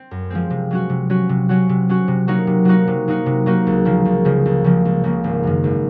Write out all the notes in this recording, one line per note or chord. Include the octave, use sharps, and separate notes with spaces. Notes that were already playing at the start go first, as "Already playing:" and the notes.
Already playing: C4
F#2
F3 G#3 C4
C3
F#3 C#4 F#4
C3
F#3 C#4 F#4
C3
F#3 C#4 F#4
C3
F#3 C#4 F#4
C3
F#3 A#3 D#4 F#4
C3
F#3 A#3 D#4 F#4
C3
F#3 A#3 D#4 F#4
C3
F#3 A#3 D#4 F#4
C#2
C#3 F3 A#3
C#2
C#3 F3 A#3
C#2
C#3 F3 A#3
C#2
C#3 F3 A#3
G#1
F#2 D#3
G#1